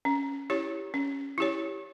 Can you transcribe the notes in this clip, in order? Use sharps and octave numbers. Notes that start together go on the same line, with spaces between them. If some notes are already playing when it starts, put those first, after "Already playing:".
C#4
E4 G4 C#5
C#4
E4 G4 C#5